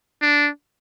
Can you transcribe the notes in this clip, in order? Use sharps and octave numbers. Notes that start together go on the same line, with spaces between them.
D4